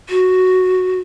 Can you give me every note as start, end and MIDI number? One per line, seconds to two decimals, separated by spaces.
0.09 1.00 66